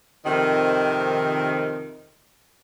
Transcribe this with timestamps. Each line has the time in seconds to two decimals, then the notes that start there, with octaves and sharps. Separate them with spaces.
0.25 F2 C3 D#3